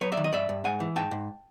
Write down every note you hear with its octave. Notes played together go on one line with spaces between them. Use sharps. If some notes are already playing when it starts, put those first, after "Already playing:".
F#3 B4 C#5
D5 E5
D#3
D#5
G2 D5 E5
G2
G#2 F#5 G#5
E3
G#2 G5 A5
G#2